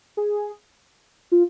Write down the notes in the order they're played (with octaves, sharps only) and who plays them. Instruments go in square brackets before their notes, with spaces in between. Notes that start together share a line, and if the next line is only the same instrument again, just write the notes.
[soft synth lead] G#4
F4